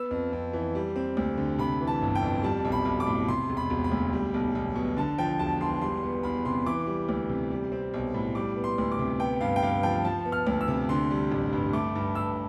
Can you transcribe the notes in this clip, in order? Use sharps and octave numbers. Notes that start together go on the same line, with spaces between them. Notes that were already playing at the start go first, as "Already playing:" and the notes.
Already playing: B3 E6
F2
F2
E3
G3
C4
D2
D3
C3 B5
E3
A5
G1
G5
F2
G3 A5
B1
B5
B1
D6
A2
C3 C6
E1
B5
E1
B5
D2
G3
B1
B1
B2
D3 A5
F3 G5
E1 A5
E2 C6
G3 C6
B3
E2 B5
C3 C6
E3 D6
G3
D2
C3
G3
C4
B1
A2
G3 D6
B3
C6
D2
D6
C3
B3 G5
G2 F5
G5
G2 F5
F3 G5
F3 A5
B3
F6
D2
E6
C3
D3 C6
G3
A1
G2
A3 D6
G2
G2 E6